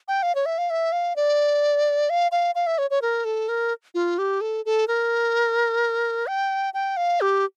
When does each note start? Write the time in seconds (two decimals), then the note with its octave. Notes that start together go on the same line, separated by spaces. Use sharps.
0.08 G5
0.23 F5
0.35 C#5
0.46 E5
0.58 F5
0.70 E5
0.92 F5
1.16 D5
2.10 F5
2.32 F5
2.55 F5
2.67 E5
2.78 C#5
2.90 C#5
3.02 A#4
3.25 A4
3.49 A#4
3.95 F4
4.18 G4
4.41 A4
4.65 A4
4.88 A#4
6.27 G5
6.74 G5
6.97 F5
7.21 G4